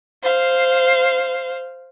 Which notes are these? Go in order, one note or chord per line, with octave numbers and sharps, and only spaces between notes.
C5 F5